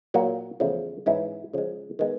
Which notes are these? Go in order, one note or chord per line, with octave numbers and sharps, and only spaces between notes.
A#2 F#3 A#3
E2 C#3 F3 A3
G#2 E3 G#3 C#4 E4
C#3 F3 G#3
D#3 G#3 B3